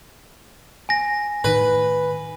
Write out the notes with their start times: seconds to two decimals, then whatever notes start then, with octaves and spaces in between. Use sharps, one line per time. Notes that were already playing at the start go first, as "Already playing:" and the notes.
0.89 G#5 A#6
1.44 A2 D#3 B4